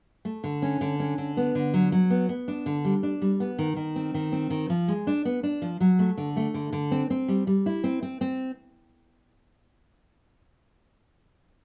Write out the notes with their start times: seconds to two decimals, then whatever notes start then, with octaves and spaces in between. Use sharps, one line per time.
0.25 A3
0.44 D3
0.62 C#4
0.81 D3
1.00 C#4
1.18 D3
1.37 B3
1.55 D3
1.74 F#3
1.92 F#3
2.10 B3
2.29 B3
2.48 D4
2.66 D3
2.85 G3
3.03 D4
3.22 G3
3.40 B3
3.59 D#3
3.76 D#3
3.96 C4
4.14 D#3
4.32 C4
4.50 D#3
4.70 F3
4.88 G#3
5.07 D4
5.25 B3
5.43 D4
5.62 F3
5.80 F#3
5.99 A3
6.17 D3
6.36 A3
6.54 D3
6.73 D3
6.91 C4
7.10 C4
7.28 G3
7.47 G3
7.66 E4
7.84 C4
8.02 C4
8.21 C4